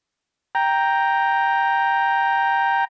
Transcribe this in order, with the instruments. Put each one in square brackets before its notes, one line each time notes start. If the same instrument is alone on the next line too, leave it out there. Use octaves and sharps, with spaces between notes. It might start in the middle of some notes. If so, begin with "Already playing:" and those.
[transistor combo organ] G5 A#5